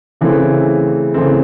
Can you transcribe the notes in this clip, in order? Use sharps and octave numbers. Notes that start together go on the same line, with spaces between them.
C#3 E3 A3 C4
C#3 E3 A3 C4